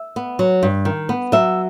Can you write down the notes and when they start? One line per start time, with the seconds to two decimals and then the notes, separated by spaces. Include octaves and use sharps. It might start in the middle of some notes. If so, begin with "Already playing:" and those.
Already playing: E5
0.16 B3
0.39 F#3
0.63 G2
0.85 D#3
1.09 B3
1.32 F#3 E5